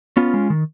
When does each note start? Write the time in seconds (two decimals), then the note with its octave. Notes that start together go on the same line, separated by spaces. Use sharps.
0.17 B3 C#4 F4
0.34 G#3
0.50 D#3